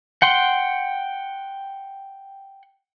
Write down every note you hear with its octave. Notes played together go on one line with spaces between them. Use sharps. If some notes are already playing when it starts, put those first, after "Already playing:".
F#5 G5 C6